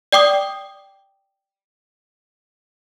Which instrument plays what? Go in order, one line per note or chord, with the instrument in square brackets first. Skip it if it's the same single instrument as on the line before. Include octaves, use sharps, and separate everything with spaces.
[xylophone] D5 G5 D6 D#6